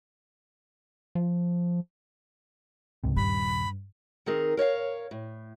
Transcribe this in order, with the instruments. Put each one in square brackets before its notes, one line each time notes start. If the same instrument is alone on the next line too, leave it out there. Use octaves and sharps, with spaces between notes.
[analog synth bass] F3
[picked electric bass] C#2 G#2 C3
[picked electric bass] D#1 G3 [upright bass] G2 [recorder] B5
[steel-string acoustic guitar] D#3 C4 D#4 G#4 A#4
A#4 C#5 D#5 F5
A2